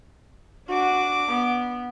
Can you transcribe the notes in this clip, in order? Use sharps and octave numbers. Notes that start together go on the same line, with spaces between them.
D4 F#4 D6
B3